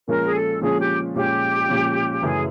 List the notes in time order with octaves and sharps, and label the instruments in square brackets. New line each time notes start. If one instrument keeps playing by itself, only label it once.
[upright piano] A#2 F3 G#3 C#4 [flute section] A#4
[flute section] G#4
A4
[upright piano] A#2 F3 G#3 C#4 [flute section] G#4
[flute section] G4
[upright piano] A#2 F3 G#3 C#4 [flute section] G4
[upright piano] A#2 F3 G#3 C#4
[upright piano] F#2 C#3 E3 A3 [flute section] G#4